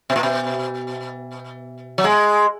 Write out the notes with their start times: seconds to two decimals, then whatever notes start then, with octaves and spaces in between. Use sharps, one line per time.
0.10 B2
0.16 A#2
0.23 B2
1.98 F#3
2.04 G#3